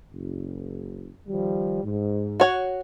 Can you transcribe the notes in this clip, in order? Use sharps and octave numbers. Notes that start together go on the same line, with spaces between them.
F#1
D#3 F3 G3
G#2
F#4 C#5 F#5